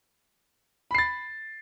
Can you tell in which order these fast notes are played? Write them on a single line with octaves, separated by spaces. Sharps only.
B5 C7 A6